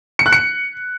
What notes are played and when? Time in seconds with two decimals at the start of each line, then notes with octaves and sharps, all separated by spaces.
0.19 C#7
0.26 F#6
0.32 C#7